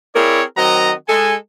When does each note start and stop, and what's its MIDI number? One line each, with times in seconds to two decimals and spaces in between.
0.15 0.43 60
0.15 0.43 64
0.15 0.43 68
0.15 0.43 70
0.15 0.43 73
0.15 0.43 74
0.57 0.93 51
0.57 0.93 54
0.57 0.93 60
0.57 0.93 66
0.57 0.93 75
0.57 0.93 82
1.09 1.35 56
1.09 1.35 69
1.09 1.35 80